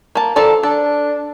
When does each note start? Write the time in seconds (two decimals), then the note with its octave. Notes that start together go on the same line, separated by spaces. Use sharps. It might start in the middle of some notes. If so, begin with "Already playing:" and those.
0.15 A#3 A5
0.36 F3 A4 A#4 D5
0.63 D4 A4